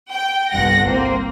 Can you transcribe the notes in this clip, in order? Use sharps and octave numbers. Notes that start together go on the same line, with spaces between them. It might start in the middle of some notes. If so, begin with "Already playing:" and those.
G5
G1 C2 G2 F#5 A#6
A#3 C4